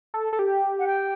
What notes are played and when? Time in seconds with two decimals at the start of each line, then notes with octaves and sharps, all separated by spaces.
0.14 A4
0.33 A4
0.39 G4
0.79 F#5
0.87 G5